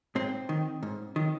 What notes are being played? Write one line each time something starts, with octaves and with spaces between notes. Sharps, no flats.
G#2 C4
D#3
G#2
D#3